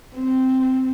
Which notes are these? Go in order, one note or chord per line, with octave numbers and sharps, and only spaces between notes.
C4